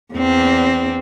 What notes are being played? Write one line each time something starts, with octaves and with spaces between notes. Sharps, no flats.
E2 C4